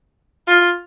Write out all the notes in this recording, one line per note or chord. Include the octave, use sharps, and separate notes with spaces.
F4